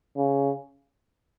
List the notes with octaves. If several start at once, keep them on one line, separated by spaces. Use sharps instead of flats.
C#3